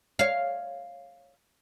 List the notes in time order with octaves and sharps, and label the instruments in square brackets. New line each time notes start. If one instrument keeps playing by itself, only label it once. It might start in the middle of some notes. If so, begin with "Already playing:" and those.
[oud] C#5 F5